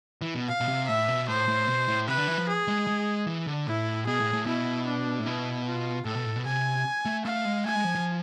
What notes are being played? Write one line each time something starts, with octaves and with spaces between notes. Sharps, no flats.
E3
B2
F5
B2
C3
A2 E5
B2
A2 C5
A2
B2
A2
C3 B4
D3
E3
F3
G#4
G#3
G#3
E3
D3
A2 E4
B2 G#4
A2
A2
B2 E4
D4
A2
B2 E4
F4
A2 A4
B2
A2
B2
C3 G#5
A3
A3 F5
G#3
A3 G#5
G#3
F3
F3